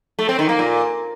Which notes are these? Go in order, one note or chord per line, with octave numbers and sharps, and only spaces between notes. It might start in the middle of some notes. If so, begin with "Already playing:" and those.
A3
C4
D#3
A#3
A#2